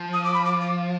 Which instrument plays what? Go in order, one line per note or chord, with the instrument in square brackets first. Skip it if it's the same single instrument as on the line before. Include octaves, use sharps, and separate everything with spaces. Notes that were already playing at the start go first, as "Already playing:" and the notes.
Already playing: [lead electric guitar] F3
[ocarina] D#6
D6
B5
D6
D6